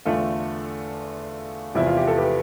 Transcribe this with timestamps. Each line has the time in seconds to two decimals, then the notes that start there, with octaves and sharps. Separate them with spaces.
0.05 E2 D3 A3 F4 A4
1.75 E2 C3 F3 E4
1.86 F4
1.97 G4
2.07 A4
2.18 G4 B4